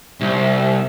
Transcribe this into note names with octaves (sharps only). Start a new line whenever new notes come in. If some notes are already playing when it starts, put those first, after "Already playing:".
C2